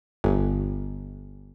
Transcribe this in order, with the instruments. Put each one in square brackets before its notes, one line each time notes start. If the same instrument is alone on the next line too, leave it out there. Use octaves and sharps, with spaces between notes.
[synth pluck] G1